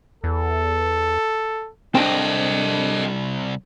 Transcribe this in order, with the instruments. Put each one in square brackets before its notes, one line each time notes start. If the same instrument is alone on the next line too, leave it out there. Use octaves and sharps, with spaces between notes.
[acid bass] E2 [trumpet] A4
[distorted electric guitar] C2 [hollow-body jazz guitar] C4 G5 [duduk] D4 [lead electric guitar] A4 D#5